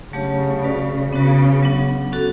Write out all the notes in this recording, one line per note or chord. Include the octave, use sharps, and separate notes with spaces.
C#3 F#3 A3 D4 G4 C#5
C#4 F#4 B4 D5
C#3 B3 D4 F#4 B4
F#3 B3 D4
C#4 F#4 A4